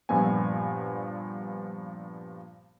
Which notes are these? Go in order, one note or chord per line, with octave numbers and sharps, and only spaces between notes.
G2 A#2 F3 B3 G#5